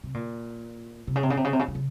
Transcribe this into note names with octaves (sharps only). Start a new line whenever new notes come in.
C3
A#2
C3
C#3
C3
C#3
C3
C#3
C3
C#3
C3
C#3